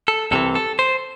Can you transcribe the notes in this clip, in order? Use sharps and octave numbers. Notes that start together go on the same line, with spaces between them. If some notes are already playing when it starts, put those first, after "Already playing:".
A4
C2 C3 E3 A4
A4
C5